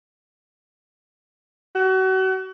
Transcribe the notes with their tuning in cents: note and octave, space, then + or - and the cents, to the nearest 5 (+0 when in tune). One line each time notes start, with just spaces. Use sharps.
F#4 +35